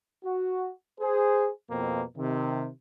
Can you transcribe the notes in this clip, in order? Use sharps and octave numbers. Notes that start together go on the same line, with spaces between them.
F#4
G#4 C5
F2 B2 A#3 C4
C3 D#3